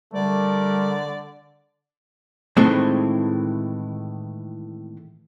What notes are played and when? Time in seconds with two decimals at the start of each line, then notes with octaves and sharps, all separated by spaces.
0.14 D3 G3 A3 A#4 D5
2.57 A2 D#3 E3 G#3 A3 C4